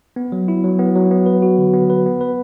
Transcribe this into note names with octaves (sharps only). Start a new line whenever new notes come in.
B3
F#3
E4
F#3
B3
F#3
B3
B4
F#4
D3
B3
B4
B3
B4